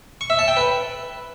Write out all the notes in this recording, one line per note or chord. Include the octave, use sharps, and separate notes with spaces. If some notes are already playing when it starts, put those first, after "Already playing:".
C#6
E5
A5
G5
B4